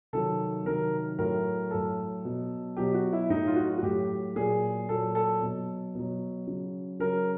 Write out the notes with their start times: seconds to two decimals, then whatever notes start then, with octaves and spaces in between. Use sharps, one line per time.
0.13 C3 D#3 F#3 A4
0.65 C3 D#3 F#3 A#4
1.19 A2 F#3 A#4
1.71 A2 F#3 A4
2.25 B2 F#3
2.77 B2 F#3 G4
2.94 F#4
3.13 E4
3.30 A2 F#3 D#4
3.47 F4
3.56 F#4
3.78 F#4
3.83 A2 F#3 G4
4.36 A#2 F#3 G#4
4.89 A#2 F#3 A4
5.15 A4
5.41 B2 F#3
5.95 B2 F#3
6.47 C#3 F#3
6.99 C#3 F#3 A#4